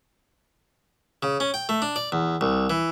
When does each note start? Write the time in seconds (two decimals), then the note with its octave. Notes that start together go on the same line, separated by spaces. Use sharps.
1.23 C#3
1.40 C#4
1.54 G5
1.69 A3
1.82 D4
1.96 D5
2.12 E2
2.41 C2
2.70 E3